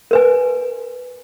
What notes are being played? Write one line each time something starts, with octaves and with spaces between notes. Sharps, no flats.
A#4 B4 G#5